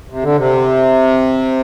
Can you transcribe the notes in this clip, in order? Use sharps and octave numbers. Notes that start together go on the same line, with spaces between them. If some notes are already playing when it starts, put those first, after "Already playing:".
C3
D3
C3